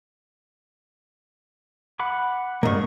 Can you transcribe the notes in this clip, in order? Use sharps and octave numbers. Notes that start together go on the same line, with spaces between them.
F#5 B5 D6
C2 G2 A#3 D#5 C#6